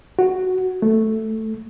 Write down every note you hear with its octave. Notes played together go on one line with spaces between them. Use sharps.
F#4
A3